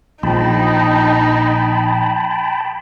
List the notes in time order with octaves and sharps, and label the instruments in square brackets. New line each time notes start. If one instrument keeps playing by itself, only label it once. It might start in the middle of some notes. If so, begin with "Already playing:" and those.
[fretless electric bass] A#1 F3 [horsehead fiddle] D#4 [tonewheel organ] G5 A5 B5